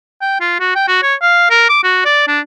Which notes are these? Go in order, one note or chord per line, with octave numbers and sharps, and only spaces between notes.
G5
F4
F#4
G5
F#4
C#5
F5
A#4
D6
F#4
D5
D4